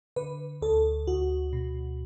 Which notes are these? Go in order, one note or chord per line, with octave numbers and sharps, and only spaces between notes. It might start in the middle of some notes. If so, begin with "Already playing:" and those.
D3 B4
D2 A4
D2 F#4
B2